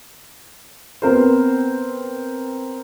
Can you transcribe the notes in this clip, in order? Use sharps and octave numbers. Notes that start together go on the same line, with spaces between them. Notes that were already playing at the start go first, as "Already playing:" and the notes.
B3 C4 A#4 C5